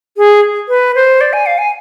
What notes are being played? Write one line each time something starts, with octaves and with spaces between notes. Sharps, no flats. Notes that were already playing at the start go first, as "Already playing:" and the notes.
G#4
B4
C5
D5
G#5
F5
G#5